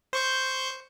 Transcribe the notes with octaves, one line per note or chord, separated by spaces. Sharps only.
C5 C#6 G6